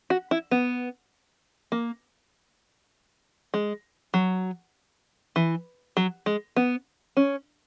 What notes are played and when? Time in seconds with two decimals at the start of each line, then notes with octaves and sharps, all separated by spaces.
0.10 F#4
0.31 E4
0.51 B3
1.72 A#3
3.54 G#3
4.14 F#3
5.36 E3
5.97 F#3
6.26 G#3
6.56 B3
7.17 C#4